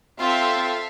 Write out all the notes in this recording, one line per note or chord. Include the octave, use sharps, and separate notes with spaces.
C4 F4 A4 E5 F5